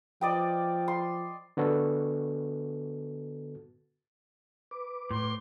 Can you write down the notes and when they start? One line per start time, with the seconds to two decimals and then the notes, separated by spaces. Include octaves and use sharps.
0.21 F3 D5 D#5 G5
0.88 C6
1.57 D3 B3 F#4 A4
4.71 B4 D6
5.11 A2 C6